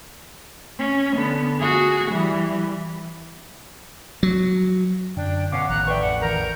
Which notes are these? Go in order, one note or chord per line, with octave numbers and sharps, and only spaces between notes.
C#4
D3 B3
F#4 G#4
E3 G3
F#3
F#2 D3 D4 G5
B2 C#4 F5 F#5 D6
A1 D#3 F3 F#5 A#5 F#6
B4 D5 E5 G5 C#6
F2 F#5
E2 D#3 E3 A#4 A#5 G6